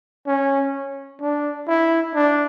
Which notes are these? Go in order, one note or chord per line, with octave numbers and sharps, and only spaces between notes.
C#4
D4
E4
D4